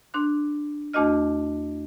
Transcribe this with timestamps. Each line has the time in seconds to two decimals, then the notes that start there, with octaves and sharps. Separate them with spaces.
0.14 D4 C6 F#6
0.93 E2 A3 D4 F#4 D#5 F6